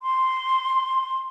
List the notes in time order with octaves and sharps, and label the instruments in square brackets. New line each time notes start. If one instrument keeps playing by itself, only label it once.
[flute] C6